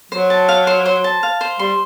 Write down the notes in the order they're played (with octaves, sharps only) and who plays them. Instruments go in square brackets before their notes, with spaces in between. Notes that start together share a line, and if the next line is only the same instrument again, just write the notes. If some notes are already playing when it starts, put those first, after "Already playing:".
[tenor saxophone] F#3 [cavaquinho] C5
[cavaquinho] A5
F5
C5
C5
A5
F5
C5
[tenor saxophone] G3 [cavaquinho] C6